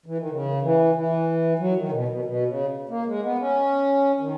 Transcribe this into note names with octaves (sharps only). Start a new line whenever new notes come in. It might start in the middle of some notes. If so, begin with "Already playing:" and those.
E3
D#3
C#3
E3
E3
F#3
D#3
C#3
B2
B2
B2
C#3
A#3
G#3
B3
C#4
D#3